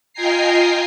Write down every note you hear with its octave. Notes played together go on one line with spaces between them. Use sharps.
F4 D#5 G5 G#5 A#5 C7